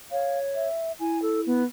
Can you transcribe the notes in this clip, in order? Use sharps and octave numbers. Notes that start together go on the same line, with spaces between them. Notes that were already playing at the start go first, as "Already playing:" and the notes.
C#5 F5
E5
E4 G#5
A4
B3